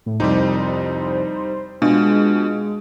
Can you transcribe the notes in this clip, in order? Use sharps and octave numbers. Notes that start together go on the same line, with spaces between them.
A2
C2 F2 G3 C4 D#4 C5 D6
B2 G#3 D4 F4